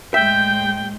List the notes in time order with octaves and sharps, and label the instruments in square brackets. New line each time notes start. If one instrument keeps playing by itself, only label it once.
[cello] A2 G#3 [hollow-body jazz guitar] E5 [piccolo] G5 [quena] G6